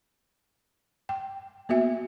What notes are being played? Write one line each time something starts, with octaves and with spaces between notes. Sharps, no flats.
G5
A#3 B3 F#4 E5